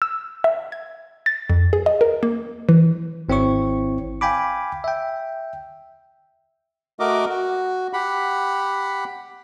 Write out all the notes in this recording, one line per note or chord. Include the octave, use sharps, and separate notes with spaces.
E6
E5
G#6
A6
F2
G#4
D#5
A#4
A#3
E3
G#1 C4 E4 C#5 C#6
F5 G5 G#5 B5 D6
E5 G5
A3 F#4 A#4 D#5 D6
F#4
G4 F#5 B5